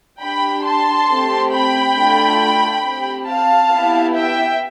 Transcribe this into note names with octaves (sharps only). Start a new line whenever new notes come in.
D4 G4 G5 B5
A5 C6
A3 C4 G4
G5 B5
A3 D4 F4
C4 G4
F5 A5
B3 E4 G4
E5 G5